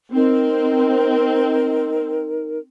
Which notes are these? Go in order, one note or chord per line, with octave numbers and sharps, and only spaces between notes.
C4 D#4 A#4